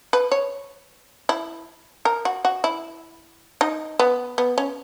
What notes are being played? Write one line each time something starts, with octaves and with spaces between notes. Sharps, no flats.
B4
C#5
E4
A#4
F#4
F#4
E4
D#4
B3
B3
C#4